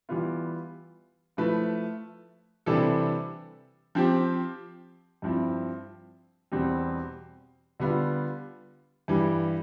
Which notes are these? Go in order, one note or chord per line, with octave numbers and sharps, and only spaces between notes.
E3 G3 B3 F4
F3 A3 E4 B4
C3 E3 G3 D4 A4
F3 C4 G4
G2 F3 C4 E4
E2 B2 G3 C4
D3 G3 B3 F4
G2 E3 G3